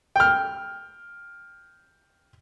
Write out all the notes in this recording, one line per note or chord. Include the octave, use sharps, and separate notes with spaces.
G5 F6